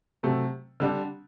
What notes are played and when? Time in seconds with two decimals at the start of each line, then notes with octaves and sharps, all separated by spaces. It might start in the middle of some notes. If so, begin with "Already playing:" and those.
0.23 C3 F#3 A3
0.80 D3 G3 D4